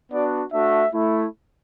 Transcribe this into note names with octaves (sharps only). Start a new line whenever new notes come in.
B3 D4 F#4 D5
A3 D4 F#4 E5
A3 E4